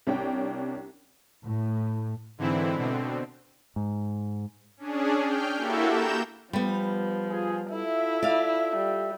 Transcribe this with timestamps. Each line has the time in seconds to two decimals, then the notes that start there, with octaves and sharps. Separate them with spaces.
0.07 C2 C#4 D4 G5
1.44 A2
2.38 G#2 D3 E3 C4 E4
2.76 B2 D3 C4
3.76 G#2
4.77 C#4 D4 G#4
5.22 G5 F6 G6
5.56 A#3 E4 F#4 G4 A4 E5
5.88 A#5 G6 E7
6.53 F3 G3 B3
7.30 F4 G#4
7.70 E4 F4 A4 E5
8.22 D5 F5
8.76 G3